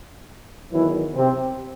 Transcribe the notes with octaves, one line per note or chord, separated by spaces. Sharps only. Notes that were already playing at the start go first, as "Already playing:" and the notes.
E2 D#3 E3 F#3 E4
C3 C4